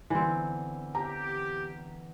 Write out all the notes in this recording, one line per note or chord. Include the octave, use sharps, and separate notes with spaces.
E2 D3 E3 C4
G4 A#5